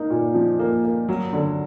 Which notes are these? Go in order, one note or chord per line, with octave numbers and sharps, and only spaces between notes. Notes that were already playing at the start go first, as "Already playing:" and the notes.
Already playing: A#3 D#4
A#2
F3
A#3
A#3
F#3
D3